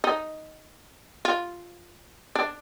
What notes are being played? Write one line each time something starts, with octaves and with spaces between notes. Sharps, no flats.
D#4
F4
D4